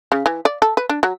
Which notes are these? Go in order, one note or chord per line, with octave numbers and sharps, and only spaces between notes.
C#3
E3
D5
A4
B4
D4
F#3